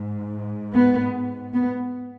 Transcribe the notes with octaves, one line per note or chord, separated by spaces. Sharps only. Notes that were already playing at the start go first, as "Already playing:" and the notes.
Already playing: G#2
B3
B3